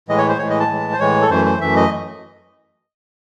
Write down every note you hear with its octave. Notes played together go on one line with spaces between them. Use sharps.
A2 E3 G#3 D#5
C#5
C5
A2 E3 G#3 C#5
D#5
A5
A2 E3 G#3
C5
A2 E3 G#3 C#5
A4
F#2 E3 A3 C5
C5
F#2 E3 A3 E5
D#5